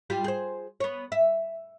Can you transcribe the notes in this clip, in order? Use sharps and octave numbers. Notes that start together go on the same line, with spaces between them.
G3 F4 G4
G#4 C5
B3 C#5
E5